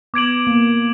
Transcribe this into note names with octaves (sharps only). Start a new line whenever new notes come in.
B3 D6 G#6 D7 F#7
A#3